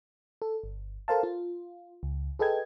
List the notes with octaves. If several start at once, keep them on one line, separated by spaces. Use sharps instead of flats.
A4
G1
A4 A#4 C5 F5 A5
F4
C#2
G#4 A4 B4 D#5 G5 G#6